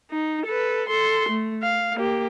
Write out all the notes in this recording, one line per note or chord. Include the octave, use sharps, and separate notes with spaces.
D#4
A4 B4
A4 C6
A3
F5
A#3 G4